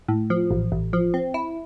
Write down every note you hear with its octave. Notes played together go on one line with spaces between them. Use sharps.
A2
F3
A1
A1
F3
C4
E4